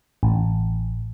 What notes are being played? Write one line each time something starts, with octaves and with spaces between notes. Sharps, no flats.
A1